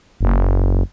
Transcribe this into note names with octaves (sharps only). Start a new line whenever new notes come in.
F#1